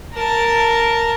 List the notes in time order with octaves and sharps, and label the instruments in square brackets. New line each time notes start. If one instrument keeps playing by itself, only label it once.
[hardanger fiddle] A#4 A5